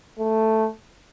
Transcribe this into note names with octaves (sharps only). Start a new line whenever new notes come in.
A3